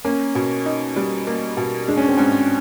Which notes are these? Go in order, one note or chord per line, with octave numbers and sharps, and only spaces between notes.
A#3 C#4
B2
D#4
G3
A#3
B2
G#3 D4
C#4
C4
G#2 C#4